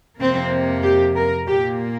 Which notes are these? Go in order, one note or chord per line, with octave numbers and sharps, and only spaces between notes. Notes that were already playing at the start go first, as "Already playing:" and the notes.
F2 C3 A#3 C4
G4
A#4
A#2 A#3 G4